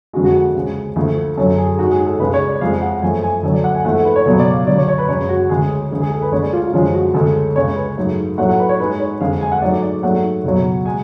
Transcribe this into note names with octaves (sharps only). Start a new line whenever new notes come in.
F2 D3 G#3 F#4
F#4
C#2 C#3 G#3
D2 D3 F3 A3
F#2 D3 F#3 A4
G#4
G#2 G#3 F#4
G#4
A4
C#2 C#3 G#3 B4
C#5
D5
F2 F3 G#3 F5
F#5
F#2 F3 A3 G#5
G#5
D2 D3 F#3 A4
D5
F#5
G#5
G#2 F3 A3 F#5
A4
B4
C#5
C#2 B2 F#3 C#5
D5
F5
D2 D3 F#3 D5
C#5
C#5
B4
F#2 C#3 G#3 C#5
F#4
D2 C#3 G#3 G#4
G#4
D2 D3 G#3 G#4
G#4
A4
B4
D2 D3 G#3 C#5
D5
F4
F4
F#2 D3 F3 G#3 F4
F#4
D2 C#3 G#3 A4
C#2 C#3 G#3 C#5
B4
G#2 F#3 A3
A2 F#3 A3 F#5
F#5
B4
C#5
G#2 G#3 B4
C#5
F2 D3 G#3 F5
G#5
F#5
G#2 F#3 A3 D5
D5
G#2 F#3 A3 F#5
C#2 B2 F#3
G#3 G#5